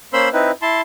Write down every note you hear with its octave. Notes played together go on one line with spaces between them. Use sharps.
A#3 C#4 C5 B5 C6 E6
C4 D#4 E4 B4
E4 A5 C6